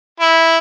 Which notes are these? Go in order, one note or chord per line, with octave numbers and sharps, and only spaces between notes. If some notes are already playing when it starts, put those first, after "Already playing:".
E4